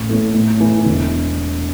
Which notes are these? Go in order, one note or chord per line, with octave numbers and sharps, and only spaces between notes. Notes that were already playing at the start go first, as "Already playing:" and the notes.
Already playing: A1
A2 E3 A3
A2
E3 A3
E1